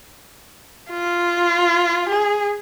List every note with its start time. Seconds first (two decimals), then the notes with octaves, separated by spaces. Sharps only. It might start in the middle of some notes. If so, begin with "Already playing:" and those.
0.90 F4
2.09 G#4